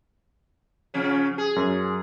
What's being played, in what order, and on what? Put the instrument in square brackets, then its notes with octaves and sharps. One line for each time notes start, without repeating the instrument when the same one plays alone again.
[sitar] C#3 F3 C#4
G#4
[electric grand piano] F#2